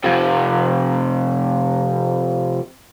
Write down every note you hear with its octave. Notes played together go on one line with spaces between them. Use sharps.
F2 C3